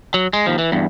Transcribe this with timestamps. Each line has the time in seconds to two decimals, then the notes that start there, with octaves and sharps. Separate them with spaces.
0.14 F#3
0.33 G#3
0.46 D#2 F3
0.58 E3
0.72 E2 G2